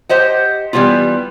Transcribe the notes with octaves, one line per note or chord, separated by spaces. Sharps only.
G4 C5 D#5 F#5
E3 G3 B3 E4 F4